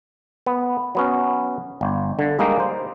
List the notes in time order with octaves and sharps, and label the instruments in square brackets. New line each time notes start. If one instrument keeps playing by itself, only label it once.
[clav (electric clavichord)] B3
F#3 B3 C#4
G1
D3
G3 G#3 A#3 D#4
C5